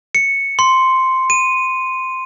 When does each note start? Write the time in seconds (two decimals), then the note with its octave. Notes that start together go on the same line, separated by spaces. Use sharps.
0.15 C#7
0.59 C6
1.30 D#7